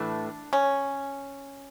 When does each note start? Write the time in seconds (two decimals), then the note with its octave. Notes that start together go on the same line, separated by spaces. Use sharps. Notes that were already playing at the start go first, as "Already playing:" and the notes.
Already playing: A2 E3 A3 D4
0.53 C#4